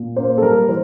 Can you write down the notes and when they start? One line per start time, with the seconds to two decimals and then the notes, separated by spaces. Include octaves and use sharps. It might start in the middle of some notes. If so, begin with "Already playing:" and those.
Already playing: A#2
0.16 A#3 C5
0.38 A4
0.42 G3 A#4
0.68 E3 C5